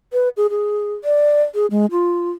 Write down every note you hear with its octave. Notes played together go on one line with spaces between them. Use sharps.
B4
G#4
G#4
D5
G#4
G#3
F4